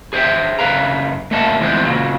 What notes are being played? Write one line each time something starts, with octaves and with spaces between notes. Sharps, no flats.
G#4 C5 C#5 E5 G5
F#2 C#3 A#3 B4 F5 A#5
A3 A#3 C#4 F#4 D#5 A5
E3 F3 G#3 B3 C4
A#2 C#3 F#3